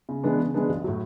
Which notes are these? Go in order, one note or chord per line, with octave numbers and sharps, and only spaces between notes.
C#3
E3 G#3 B3 D4
C#3
E3 G#3 B3 D4
B1
A2 F#3